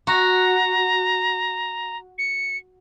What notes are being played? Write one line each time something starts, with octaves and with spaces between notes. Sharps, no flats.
F#4 A#5
C#7